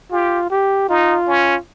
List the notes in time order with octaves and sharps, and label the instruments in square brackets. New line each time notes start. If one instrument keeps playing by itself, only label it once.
[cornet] F4 [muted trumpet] G4
[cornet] G4
[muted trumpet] D#4 [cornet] F4
[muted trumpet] C#4